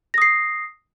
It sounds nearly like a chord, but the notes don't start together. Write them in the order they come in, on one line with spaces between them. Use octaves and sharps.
A#6 D#6 C7